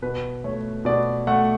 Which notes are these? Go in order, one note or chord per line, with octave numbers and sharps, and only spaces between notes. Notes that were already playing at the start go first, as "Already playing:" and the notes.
B2 B4
A3 C#5
B2 D5
A3 F#5